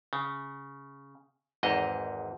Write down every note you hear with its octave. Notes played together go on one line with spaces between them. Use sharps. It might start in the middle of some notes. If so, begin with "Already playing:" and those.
C#3
G#1 E2 G#2 D#5